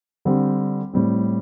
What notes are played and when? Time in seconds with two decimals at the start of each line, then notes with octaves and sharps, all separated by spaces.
0.25 D3 G3 C4 G4
0.93 A2 G3 C4